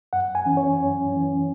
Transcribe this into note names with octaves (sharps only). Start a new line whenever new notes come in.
F#2 F#5
G#5
E3 C#4
C#5
F#2
E3 C#4